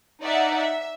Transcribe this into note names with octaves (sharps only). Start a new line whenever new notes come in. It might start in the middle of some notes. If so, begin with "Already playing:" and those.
D#4 D5 E5 F#5
E5